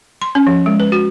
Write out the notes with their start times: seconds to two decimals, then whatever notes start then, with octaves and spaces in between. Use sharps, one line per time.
0.22 C6
0.35 C#4
0.47 F3
0.66 G#3
0.80 B4
0.92 F#4